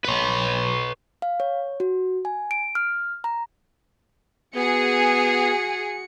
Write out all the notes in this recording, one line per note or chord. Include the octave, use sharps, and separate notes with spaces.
B4 C#5
F5
C#5
F#4
G#5
D7
F6
A#5
B3 F#4 G#4 C#7